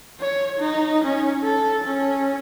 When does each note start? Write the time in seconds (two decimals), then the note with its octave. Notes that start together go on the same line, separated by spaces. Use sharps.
0.20 C#5
0.59 D#4
1.04 C#4
1.43 A4
1.84 C#4